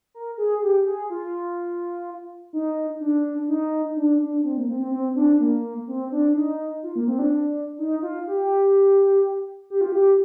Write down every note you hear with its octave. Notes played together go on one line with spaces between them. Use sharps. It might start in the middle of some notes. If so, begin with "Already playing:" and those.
A#4
G#4
G4
G#4
F4
D#4
D4
D#4
D4
D4
C4
A#3
C4
C4
C4
D4
A#3
C4
D4
D#4
F4
A#3
C4
D4
D#4
F4
G4
G4
F4
G4